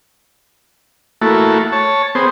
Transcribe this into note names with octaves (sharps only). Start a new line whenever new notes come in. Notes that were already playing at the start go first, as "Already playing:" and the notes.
A3 A#3 E4 F#4 A4
C#5 A5
B3 C4 G#4 C5